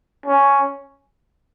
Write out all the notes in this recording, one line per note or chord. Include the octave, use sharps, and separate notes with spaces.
C#4